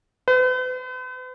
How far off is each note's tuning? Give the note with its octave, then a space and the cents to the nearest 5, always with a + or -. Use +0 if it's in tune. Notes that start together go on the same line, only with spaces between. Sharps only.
B4 +45